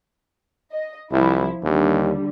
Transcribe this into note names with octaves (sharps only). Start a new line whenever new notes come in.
D#5
C2 F3 E4
D#2 D3 G3